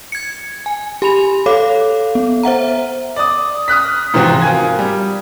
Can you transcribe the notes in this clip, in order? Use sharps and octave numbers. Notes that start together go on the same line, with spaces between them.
G#6 C#7
G#5
G4 G#5 B5 F7
A4 C#5 F5 D6
B3
C5 E5 F#5 A#5
D5 D#6
D#6 F6 F#6 B6
G#2 C3 E3 F3 C4 F#4
F4 A#4 G#5 G#6
G3